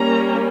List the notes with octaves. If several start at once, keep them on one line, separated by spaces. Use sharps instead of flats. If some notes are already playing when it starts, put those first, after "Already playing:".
Already playing: G3 A#3 C#4 A#5